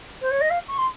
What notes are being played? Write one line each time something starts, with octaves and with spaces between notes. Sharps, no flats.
C5
C#5
D#5
F5
C#6
C6